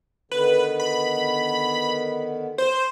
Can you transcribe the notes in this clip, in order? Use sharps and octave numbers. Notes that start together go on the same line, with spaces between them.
D3 D#3 B3 B4
B5
C5